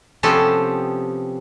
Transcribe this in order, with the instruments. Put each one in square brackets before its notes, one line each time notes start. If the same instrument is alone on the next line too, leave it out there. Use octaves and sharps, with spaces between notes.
[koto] C3 F3 B3 C#4 G4 A4